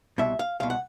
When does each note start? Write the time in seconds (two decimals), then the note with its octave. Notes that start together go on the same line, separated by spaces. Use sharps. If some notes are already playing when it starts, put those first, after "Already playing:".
0.18 C2 B2 E5
0.39 F5
0.60 C2 B2 F5
0.70 F#5